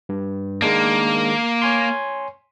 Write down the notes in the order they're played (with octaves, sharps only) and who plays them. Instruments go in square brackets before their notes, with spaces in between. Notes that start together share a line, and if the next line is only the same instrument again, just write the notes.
[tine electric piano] G2
[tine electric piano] D#3 G#3 D4 [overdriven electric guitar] A#3
[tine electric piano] C#5 G#5 C6